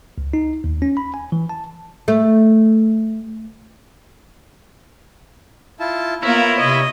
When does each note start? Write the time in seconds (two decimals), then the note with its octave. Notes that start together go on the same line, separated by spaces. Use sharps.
0.18 C#2
0.33 D#4
0.64 D#2
0.82 C#4
0.97 B5
1.14 G#5
1.32 E3
1.49 A5
2.08 A3
5.80 E4 F4 A5
6.23 A#3 B3 E4 F4 A#4 C#5
6.59 C3 D#5